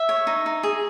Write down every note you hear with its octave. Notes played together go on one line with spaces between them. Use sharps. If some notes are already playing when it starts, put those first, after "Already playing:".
Already playing: E5
C#5
D#4
D#4
G#4